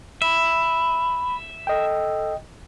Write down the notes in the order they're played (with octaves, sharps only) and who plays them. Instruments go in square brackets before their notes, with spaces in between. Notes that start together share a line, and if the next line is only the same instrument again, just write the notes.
[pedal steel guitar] E5 [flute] B5
[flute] A4 [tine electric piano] D#5 G5